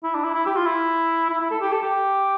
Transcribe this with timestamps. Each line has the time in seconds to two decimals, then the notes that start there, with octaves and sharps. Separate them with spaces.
0.03 E4
0.15 D4
0.24 E4
0.34 E4
0.46 G4
0.56 F4
0.67 E4
1.29 E4
1.40 E4
1.51 A4
1.61 G4
1.72 A4
1.82 G4